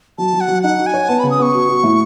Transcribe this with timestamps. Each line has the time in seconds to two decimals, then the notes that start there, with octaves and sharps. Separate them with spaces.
0.18 F#3 A5
0.33 F#3
0.41 F#5
0.48 F#3
0.63 D#4 F#5
0.78 F#4
0.86 G#5
0.94 C#5
1.09 B3 A5
1.19 C#3 B5
1.31 D#6
1.39 B3 C#6
1.54 F#4
1.69 F#4
1.83 A2